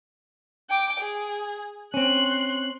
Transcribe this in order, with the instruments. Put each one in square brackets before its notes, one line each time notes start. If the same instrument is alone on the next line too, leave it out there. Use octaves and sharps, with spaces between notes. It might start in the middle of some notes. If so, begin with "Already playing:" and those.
[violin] G5 D6
G#4
[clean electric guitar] C4 C#4 [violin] C6 F#6